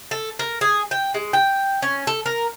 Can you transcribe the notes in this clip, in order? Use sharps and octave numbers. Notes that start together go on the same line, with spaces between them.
A4
A#4
G#4
G5
G#3
G5
C#4
A4
A#4